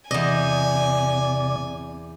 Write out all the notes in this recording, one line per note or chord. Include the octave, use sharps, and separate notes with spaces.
E2 C3 D5 D#5 G#5